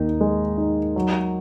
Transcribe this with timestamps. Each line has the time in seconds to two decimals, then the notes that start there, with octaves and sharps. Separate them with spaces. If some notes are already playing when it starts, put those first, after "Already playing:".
Already playing: D#2 D#4
0.21 G#3
0.57 D#4
0.96 F#3